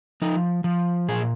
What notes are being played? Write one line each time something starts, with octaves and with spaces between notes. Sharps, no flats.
F3 D#4
F3
A#2 G#4